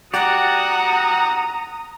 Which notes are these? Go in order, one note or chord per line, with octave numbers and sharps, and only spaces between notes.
F#4 G4 D5 F#5 A#5 D#6